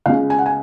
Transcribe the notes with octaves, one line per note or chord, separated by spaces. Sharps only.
C#2 C#3 F5
G#5
F#5
G#5